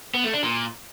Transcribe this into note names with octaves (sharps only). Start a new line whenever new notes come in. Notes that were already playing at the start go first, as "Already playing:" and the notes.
B3
A3
D4
A#2